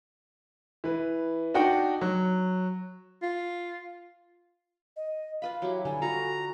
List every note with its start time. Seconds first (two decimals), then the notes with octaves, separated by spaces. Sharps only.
0.84 E3 B4
1.54 D4 D#4 F#4 F#5 G5
2.01 F#3
3.22 F4
4.96 D#5
5.42 F4 B4 F5 B5
5.62 F#3 E4 G4
5.85 D3 G3 G#5
6.02 F4 F#4 A4 F5 A#5